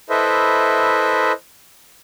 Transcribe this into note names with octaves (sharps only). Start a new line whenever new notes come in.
E4 A4 B4 C5 D#5 E5